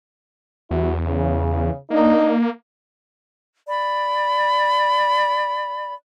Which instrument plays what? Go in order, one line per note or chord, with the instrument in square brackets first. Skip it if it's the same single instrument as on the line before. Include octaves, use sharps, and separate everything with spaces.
[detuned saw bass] E2 [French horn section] G3 E4 F#4
[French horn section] C#3
[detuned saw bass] A#3 [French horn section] D4 D#4
[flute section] D5 B5